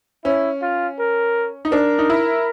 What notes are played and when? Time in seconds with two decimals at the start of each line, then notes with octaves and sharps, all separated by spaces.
0.25 C#4 E4
0.62 F4
0.99 A#4
1.65 D#4
1.72 D4 A#4
1.99 D#4
2.10 E4